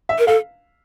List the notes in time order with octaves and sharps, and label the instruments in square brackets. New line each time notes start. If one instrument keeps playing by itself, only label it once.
[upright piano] E5
[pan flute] A#4
[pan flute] A4 [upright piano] F5